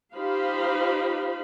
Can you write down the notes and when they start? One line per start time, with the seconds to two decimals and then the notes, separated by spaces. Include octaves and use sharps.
0.16 D#4 F4 G4 C5 F5 B5